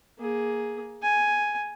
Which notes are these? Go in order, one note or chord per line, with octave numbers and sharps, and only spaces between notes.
A#3 G#4
G#5